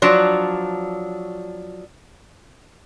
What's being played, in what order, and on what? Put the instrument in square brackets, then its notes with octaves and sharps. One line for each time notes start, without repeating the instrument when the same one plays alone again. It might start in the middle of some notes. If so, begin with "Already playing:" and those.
[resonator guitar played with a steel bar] F3 F#3 D4